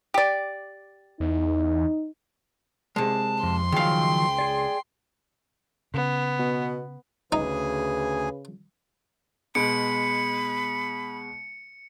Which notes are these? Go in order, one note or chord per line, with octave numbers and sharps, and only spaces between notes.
G4 D5
E2 D#4
C3 G#3 A5
F2 C6
C#2 D#3 F3 F#3 F5 G5
G#4 D5
C#3 B3
B2
D2 C#3 D#4 G#4 B4 G#5
B2 G#3 B5 C#7 D7